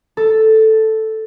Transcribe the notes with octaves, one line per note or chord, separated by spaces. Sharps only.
A4